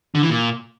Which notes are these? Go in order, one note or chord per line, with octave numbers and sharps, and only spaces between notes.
D3
E3
A#2